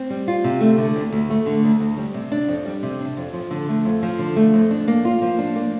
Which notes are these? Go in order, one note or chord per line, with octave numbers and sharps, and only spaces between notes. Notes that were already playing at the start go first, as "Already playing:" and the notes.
Already playing: C4
G3
F4
C3
A3
D3
D2
D2
A3
D3
D2
D2
G3
C3
D4
F2
G3
C3
D4
F2
F3
D3
A3
F2
F3
D3
A3
F2
D4
A#3
F4
F3
D4
A#3